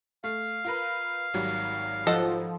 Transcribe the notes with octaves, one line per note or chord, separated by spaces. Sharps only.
A3 F5
F4 A#4 B4
G#1 F#3 G3
F3 A4 D#5 F#5